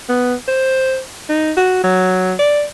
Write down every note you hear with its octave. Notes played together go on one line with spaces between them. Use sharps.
B3
C5
D#4
F#4
F#3
D5